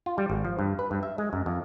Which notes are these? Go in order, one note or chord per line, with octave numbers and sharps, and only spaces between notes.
F4
G3
G#1
F3
G2
B4
G2
E5
G#3
F#2
F2